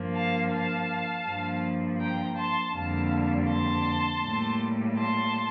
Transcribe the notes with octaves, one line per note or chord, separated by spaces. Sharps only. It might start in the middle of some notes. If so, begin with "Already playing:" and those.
Already playing: G2 F3 A#3
F5 A5
F5 A5
G2 F3 A#3
G5 A#5
A5 C6
F2 D3 G3 A#3 F5 A5
A5 C6
A2 G3 A#3
A5 C6